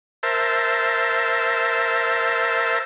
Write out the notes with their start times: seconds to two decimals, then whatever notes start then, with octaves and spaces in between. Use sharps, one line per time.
0.23 A#4 C5 E5 A5